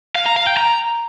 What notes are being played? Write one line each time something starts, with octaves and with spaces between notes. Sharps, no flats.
F5
A#5
F5
G5
A#5